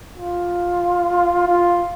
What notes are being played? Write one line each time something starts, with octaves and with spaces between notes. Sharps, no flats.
F4
F4